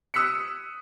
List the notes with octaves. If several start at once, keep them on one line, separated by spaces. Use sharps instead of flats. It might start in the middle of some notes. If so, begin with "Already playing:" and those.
D#6 E6 F#6 B6 C#7